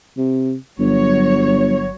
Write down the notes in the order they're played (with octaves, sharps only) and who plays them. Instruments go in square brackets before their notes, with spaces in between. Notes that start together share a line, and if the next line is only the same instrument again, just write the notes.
[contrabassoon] C3
[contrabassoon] G1 [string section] F#3 C#5